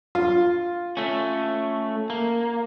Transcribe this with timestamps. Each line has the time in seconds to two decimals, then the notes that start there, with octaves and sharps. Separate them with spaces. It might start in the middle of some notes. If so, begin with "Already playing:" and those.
0.15 F4
0.97 A3 C#4
2.10 A#3